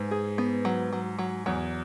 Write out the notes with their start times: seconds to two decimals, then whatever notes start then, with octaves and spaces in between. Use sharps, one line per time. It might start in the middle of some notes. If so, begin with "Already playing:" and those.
Already playing: G#2 B4
0.11 G#4
0.38 B3
0.65 F#3
0.93 F#3
1.19 F#3
1.46 E2 F#3